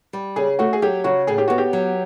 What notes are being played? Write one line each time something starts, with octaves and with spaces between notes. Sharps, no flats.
G3
C#3 G#4
A3 F#4
G#4
F#3 G4
C#3 F#4
A2 G#4
G4
B3 F#4
G4
F#3